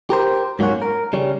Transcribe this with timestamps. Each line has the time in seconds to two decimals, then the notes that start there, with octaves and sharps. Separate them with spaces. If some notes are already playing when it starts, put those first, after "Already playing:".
0.10 G4 A#4 C5
0.59 G#2 F#3 A#3 C4 C#4 F#4
0.82 A#4
1.13 C#3 G3 C#4